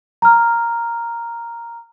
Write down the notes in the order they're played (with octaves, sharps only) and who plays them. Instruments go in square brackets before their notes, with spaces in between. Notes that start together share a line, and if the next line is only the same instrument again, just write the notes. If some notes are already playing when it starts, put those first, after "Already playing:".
[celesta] A#5 F6